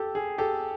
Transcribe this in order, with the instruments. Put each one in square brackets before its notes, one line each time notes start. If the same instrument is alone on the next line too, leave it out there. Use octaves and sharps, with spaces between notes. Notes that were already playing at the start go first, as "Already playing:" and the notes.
Already playing: [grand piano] G4 A4
G#4
G4 A4